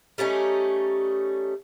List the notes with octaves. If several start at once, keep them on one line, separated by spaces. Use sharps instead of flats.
G3 A3 C#4 D#4